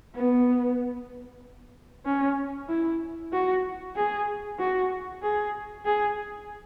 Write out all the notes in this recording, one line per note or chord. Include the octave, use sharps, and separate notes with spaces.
B3
C#4
E4
F#4
G#4
F#4
G#4
G#4